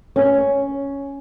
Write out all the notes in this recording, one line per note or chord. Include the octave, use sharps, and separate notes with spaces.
C#4